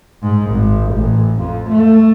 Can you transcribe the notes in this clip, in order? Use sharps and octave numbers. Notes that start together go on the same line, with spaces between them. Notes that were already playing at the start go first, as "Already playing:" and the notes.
G#2
G#1
A1
F2
A3